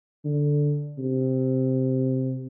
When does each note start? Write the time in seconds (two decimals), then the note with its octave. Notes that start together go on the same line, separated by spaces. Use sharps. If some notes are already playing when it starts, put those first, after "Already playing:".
0.25 D3
0.99 C3